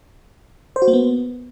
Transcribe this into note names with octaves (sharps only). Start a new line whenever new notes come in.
C5
F#4
A#3
B3